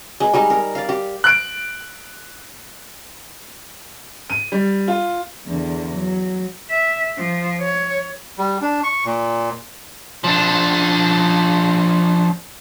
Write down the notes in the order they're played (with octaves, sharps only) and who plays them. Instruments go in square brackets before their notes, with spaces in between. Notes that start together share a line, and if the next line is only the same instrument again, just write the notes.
[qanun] G#3 B4
G3 G#3 D#4
A#4
D5 F5
G4
[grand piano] F#6 D7
[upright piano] D#7
G3
F4
[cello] E2 D3
F#3
E5
F3
C#5
[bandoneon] G3
D4
C#6
A#2
[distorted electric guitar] F3 D4